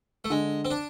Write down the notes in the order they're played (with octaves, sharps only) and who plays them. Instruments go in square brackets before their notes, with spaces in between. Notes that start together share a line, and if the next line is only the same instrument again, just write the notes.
[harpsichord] A3
[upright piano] D3 [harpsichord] G#3
[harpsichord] C4
D4